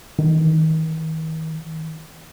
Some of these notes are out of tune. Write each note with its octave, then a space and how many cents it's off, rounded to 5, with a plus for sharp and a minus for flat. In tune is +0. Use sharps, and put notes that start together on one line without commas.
D#3 +40